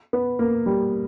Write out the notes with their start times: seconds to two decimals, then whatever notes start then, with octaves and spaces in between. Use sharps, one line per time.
0.13 B3
0.39 A#3
0.66 G3